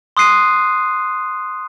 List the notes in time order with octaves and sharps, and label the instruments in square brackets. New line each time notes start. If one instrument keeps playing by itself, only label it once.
[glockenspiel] C6 D#6 F#6 C7 D#7